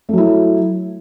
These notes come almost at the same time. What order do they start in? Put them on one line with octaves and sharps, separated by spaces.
A3 F#3 E4